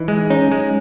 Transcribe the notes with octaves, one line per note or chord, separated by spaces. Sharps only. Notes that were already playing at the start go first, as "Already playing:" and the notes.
Already playing: E3 D#4
G#3
C#4 D#4
G#3